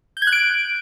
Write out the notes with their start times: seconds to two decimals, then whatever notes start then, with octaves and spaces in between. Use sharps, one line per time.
0.17 G6
0.22 G#6
0.27 F#6
0.32 D7